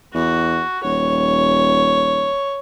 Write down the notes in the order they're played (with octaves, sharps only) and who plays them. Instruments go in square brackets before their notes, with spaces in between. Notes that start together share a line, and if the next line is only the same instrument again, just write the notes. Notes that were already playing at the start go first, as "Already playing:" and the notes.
[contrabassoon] E2 [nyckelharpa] F#4
[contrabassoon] D#1 [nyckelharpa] C#5